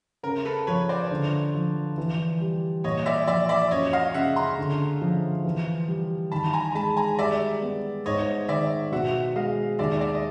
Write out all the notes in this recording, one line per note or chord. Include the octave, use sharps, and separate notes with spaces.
C#3 A#4
A4 B4
F3 B4 C#5
C5 D5
D3
F3
E3
G3
A#2 C#5 D#5
D5 E5
F3 D5 E5
D5 E5
F#2 C#5 D#5
D#5 F5
C#3 E5 F#5
A#5 C6
D3
F3
E3
G3
D#3 A5 B5
G#5 A#5
G#3 A5 B5
G#5 A#5
G3 D5 E5
B3
G#2 C#5 D#5
D#3 D5 E5
B2 E5 F#5
G#3 D#5 F5
D#2 D5 E5
D5 E5
D#5